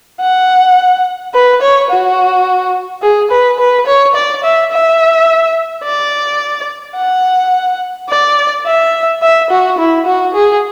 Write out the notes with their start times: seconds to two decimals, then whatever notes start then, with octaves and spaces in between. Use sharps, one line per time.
0.21 F#5
1.34 B4
1.62 C#5
1.90 F#4
3.02 G#4
3.31 B4
3.59 B4
3.86 C#5
4.15 D5
4.44 E5
4.71 E5
5.84 D5
6.97 F#5
8.10 D5
8.66 E5
9.22 E5
9.50 F#4
9.78 E4
10.06 F#4
10.34 G#4